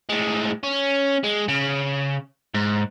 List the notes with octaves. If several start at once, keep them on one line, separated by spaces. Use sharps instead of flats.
A2 G#3
C#4
G#3
C#3
G#2